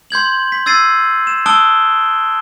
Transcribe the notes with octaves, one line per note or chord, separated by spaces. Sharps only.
C6 G6 G#6 F#7
B6
E6 G#6 A6 C7 D#7
E7
A5 D#6 E6 F#6 D7 G7